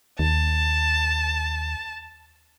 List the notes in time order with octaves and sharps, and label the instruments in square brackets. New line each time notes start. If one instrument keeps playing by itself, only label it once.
[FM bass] D#2 [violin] A5